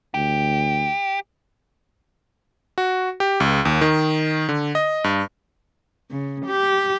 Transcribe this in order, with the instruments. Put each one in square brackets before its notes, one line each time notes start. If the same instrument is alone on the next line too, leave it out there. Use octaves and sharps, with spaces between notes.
[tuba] D2 [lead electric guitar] G4
[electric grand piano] F#4
G4
C#2
D#2
D#3
D3
D#5
G2
[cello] C#3
G4